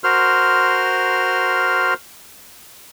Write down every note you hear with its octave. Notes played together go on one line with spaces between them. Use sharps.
F#4 A#4 C5 C6 F6